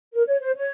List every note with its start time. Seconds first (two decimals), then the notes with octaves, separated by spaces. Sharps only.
0.13 A#4
0.27 C#5
0.41 C5
0.55 C#5